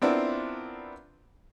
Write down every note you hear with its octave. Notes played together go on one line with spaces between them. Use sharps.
B3 C4 D4 E4 F4 A#4